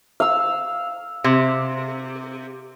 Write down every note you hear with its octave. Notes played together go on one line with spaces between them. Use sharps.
F5 E6
C3